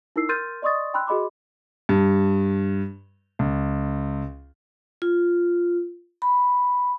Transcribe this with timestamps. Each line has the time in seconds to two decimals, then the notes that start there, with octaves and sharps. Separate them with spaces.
0.16 D#4 E4 A#4 E6 C7
0.29 A#4 C6 F6 G6 A6 D#7
0.62 D5 D#5 C6 C#6 D#6 A6
0.94 G5 B5 C6 E6 F#6
1.07 F#4 G#4 D#5 B5 C6 D6
1.89 G2
3.39 C#2
5.02 F4
6.22 B5